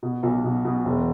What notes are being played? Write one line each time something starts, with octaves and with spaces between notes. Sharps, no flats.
B2
B1
B2
B2
E1